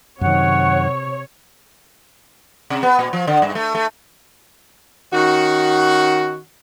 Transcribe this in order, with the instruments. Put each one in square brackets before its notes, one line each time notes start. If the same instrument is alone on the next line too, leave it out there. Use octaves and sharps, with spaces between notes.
[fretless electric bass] F#2 D#3 [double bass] C3 [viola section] C#5 [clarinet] F#5
[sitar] C3
B3
A#2
F3
D3
G2
A3
A3
[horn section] D#3 C#4 F#4